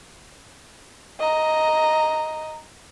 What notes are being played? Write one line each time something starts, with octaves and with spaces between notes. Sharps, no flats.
D#5 A#5